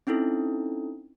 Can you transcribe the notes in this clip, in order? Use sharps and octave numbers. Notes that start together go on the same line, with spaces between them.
C4 C#4 D#4 E4 A4